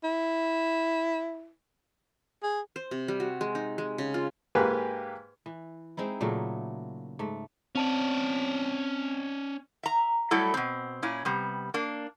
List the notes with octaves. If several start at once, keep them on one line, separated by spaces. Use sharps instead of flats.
E4
G#4
C5
C3
G3
F#4
G#3
D#4
G#3
C#3
F4
G#2 A#3 G4 B4 G#5
E3
G#3 C4 D#4 E4
A#2 C#3 F#3 A3
G#2 A3
C4 C#4 D5 A5
E5 A#5
F#3 G3 A3 E4 A4
B2 C4
A#2 C#4 E4
C3 G3 B3
A#3 D4